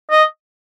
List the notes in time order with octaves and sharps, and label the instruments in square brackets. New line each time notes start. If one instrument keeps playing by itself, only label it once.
[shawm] D#5